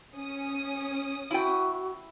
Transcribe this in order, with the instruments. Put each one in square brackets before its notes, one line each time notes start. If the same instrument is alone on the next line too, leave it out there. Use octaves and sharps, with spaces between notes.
[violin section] C#4 D#6
[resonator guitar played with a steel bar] E4 G5 [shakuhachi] F#4